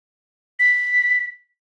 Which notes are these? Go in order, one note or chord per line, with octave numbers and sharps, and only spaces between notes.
B6